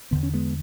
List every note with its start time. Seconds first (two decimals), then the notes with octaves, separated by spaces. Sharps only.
0.11 E2 D3 B3
0.23 C#4
0.34 G#3 B3